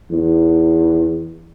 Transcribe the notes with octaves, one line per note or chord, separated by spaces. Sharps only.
E2